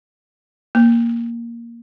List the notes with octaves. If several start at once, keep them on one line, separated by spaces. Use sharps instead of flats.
A#3